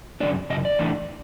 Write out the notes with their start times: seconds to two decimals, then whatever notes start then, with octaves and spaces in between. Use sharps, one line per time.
0.20 F#2 C#3 F3 A#3 D4 D5
0.50 F#2 C#3 D#5
0.65 D5
0.79 A2 E3 A3 D4